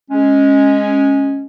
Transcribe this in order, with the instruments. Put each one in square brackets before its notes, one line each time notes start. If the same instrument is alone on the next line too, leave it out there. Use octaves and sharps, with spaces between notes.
[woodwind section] G#3 C#4